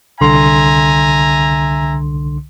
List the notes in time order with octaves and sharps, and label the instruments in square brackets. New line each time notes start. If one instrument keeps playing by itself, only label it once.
[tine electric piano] C2 D3 C6 [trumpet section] E5 G#5 A#5